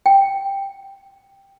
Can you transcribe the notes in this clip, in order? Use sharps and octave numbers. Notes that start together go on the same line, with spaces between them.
G5